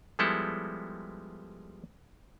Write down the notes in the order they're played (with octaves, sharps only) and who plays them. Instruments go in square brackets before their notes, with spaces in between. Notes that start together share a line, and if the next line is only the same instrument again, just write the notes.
[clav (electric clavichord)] F3 G3 G#3 B3 E4 A4